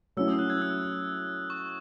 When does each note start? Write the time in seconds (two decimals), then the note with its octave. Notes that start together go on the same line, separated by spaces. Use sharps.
0.17 F#3 A3 C#4 E4 E6
0.28 D#6
0.39 F#6
0.50 G#6
0.62 E6
1.50 C#6